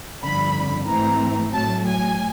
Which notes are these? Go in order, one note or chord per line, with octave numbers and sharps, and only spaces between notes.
G1 F2 D3 B5
G#2 E3 A3 C4 A#5
A2 F#3 A3 A5
G#5